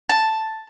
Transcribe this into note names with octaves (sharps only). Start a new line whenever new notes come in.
A5